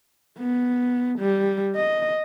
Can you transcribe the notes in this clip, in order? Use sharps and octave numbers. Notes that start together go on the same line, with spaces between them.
B3
G3
D#5